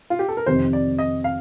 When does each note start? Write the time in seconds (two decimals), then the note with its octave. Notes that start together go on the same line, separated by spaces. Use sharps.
0.10 F4
0.19 G4
0.28 A4
0.37 A#4
0.46 F2 C3 D#3 C5
0.73 D5
0.99 D#5
1.24 F5